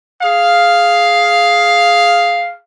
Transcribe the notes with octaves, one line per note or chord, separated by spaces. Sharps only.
G#4 F5